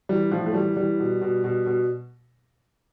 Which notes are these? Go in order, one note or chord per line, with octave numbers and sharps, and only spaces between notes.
E3 G3
A2 F3
A3
E3 G3
E3 G3
B2
B2
B2
B2